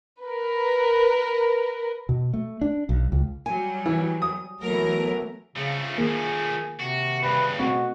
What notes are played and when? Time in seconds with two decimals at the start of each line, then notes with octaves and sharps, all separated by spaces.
0.21 A#4 B4
2.09 B2
2.34 A3
2.61 D4
2.89 B1
3.12 C#2
3.46 F#3 G3 G#5
3.86 E3
4.22 D#6
4.61 E3 F#3 A3 B3 A#4
5.56 C#3 F3 A3
5.98 D#3 A#3 G#4
6.80 C3 F#4
7.23 G2 C#3 B4
7.59 B2 A3 C4 F#4